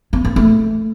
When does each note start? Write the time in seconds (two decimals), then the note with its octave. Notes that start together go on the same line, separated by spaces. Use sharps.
0.13 B3
0.25 A#3
0.36 A3